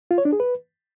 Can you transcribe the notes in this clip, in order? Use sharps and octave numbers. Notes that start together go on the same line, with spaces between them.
F4
C#5
D4
G#4
B4